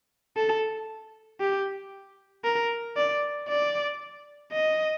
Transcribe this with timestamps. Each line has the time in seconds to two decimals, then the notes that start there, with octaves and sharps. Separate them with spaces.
0.37 A4
1.41 G4
2.44 A#4
2.97 D5
3.48 D5
4.52 D#5